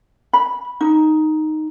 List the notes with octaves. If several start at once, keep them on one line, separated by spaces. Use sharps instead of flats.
B5
D#4